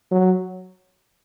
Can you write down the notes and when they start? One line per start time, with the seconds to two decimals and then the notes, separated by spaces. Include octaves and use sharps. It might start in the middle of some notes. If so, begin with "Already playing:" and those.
0.11 F#3